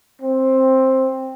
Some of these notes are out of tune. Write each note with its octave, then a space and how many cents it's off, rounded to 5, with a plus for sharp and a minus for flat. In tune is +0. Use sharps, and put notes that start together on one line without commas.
C4 +10